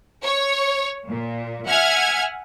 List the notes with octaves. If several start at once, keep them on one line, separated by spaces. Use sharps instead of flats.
C#5
A#2
E5 F#5 G#5 F6 G#6